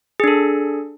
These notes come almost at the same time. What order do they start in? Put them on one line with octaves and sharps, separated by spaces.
G#4 D4 A4